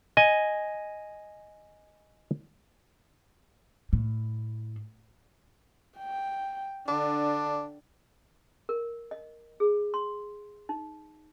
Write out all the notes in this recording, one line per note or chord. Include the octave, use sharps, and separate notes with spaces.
D#5 G#5
A2
G5
D3 D4
A#4
D#5
G#4
C6
D#4